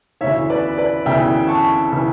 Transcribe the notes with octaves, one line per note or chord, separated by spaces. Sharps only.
D2 C#3 E3 C#5 E5
B4 D5
B4 D5
D2 C#3 E3 E5 G5
A5 C#6
C#3 E3